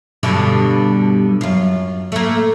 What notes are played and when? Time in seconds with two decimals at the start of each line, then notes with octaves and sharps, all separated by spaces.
0.23 G2 B2 D3
1.41 F#2 F4
2.12 A3 A#3